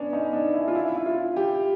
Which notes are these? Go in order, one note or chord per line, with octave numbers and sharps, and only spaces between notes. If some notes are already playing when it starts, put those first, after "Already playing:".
Already playing: B3 C#4 D4
D#4
D4
E4
F4
E4
E4
F4
G4